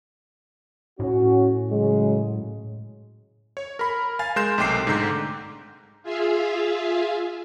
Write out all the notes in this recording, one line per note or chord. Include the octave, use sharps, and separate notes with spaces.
A2 C#4 F#4
C#3 F#3 G#3
C#5
A#4 B5
F5 G#5 A6
G#3 A#4 C6 F#6 G6 E7
B1 C3 A3 G5 D6 C7
G#2 D3 A#5 G6
F4 G#4 E5 F5